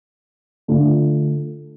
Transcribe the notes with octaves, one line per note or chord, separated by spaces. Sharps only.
D3 A3 D4 F4